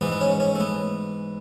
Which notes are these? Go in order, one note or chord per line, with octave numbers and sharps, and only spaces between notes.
G#2 E3 B3
B3
C#4
C#4
A3
B3